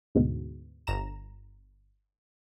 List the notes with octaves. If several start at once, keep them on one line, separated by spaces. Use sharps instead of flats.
D2 G#2 B2
G1 A#5 E7